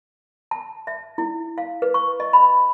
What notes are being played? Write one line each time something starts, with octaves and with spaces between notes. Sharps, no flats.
A5
E5
E4
F5
B4
C#6
D#5
B5